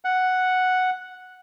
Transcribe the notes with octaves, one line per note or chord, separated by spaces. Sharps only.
F#5